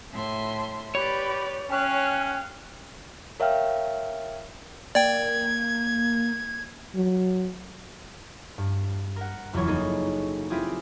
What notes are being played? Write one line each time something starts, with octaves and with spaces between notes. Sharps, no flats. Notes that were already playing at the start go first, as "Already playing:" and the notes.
A2 E5 C6
G4 B4 C#5 D5 B5
C#4 F5 G5 F6 F#6
A#4 C#5 E5 F5 G5 F6
A#3 D5 G5 G#6
F#3
G2
A#4 F#5
F#1 E2 F#3 F4 C#5
A#3 D#4 E4 G#4 A4
C4 E4 F4 G4 G#4